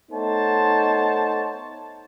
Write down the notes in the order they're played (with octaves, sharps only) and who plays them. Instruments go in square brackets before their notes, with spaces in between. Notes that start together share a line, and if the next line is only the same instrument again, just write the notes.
[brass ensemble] A3 B3 D#4 C5 C#5 A5